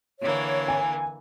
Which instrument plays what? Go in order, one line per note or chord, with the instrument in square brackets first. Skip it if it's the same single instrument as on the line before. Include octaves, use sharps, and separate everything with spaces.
[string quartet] D3 E3 A#3 [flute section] C#5
[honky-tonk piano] G#5